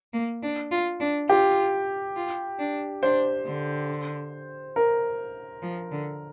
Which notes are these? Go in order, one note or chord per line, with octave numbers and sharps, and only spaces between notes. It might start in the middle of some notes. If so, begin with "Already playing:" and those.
A#3
D4
F4
D4
F4 G4
F4
D4
D4 C5
D3
A#4
F3
D3